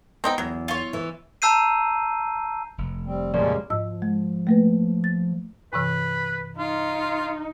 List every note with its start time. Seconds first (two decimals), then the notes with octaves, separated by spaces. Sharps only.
0.24 B3 C4 D#4 G5
0.38 E2 F#3
0.68 F4 C#5
0.93 E3
1.42 A5 A#5 E6 G6 C7 D#7
2.78 F1
3.06 G3 C4
3.34 F2 A#2 C#3 G3 G#3 C#4 D5
3.70 G#2 F3 D#5 E6
4.02 G#3
4.47 A3 A#3 B4
5.04 A6
5.73 G2 C3 E3 B4
6.58 D#4 F4